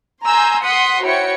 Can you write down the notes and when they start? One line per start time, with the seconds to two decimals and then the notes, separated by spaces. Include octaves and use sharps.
0.24 G#5 A#5 C6 E6 G6
0.62 F#5 C6 D#6 B6 C#7
1.02 E4 F#4 C5 C#5 G5 C#7